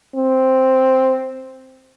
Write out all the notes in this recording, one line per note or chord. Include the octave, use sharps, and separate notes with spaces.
C4